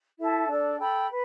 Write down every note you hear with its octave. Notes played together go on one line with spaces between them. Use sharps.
E4 A4 E5 A5
D4 A4 D5
A4 G5 B5
B4